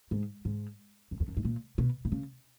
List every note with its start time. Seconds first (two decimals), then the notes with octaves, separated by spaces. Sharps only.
0.11 G#2
0.45 G#2
1.11 F#2
1.20 E2
1.28 F#2
1.37 G#2
1.45 A#2
1.78 B2
2.05 B2
2.12 C#3